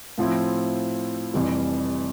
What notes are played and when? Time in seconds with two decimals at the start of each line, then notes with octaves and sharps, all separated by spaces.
0.18 A2 F3 C4 E4
1.34 F1 F2 E3 G3